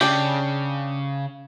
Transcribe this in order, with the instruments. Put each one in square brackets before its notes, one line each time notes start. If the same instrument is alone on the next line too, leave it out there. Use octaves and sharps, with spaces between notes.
[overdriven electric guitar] C#3 [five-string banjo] D4 G4